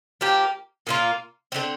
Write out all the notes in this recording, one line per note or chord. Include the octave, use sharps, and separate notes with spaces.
F3 A#3 G4
A#2 A#3 F4
D3 G3 C4